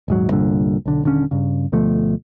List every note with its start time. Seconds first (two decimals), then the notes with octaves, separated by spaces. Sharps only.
0.08 D#1 G#2 F#3
0.30 C2 G2 A#2 D3
0.86 B1 D3
1.03 D#1 D3 C#4
1.31 G2 C#3
1.72 D2 B2 F3 A3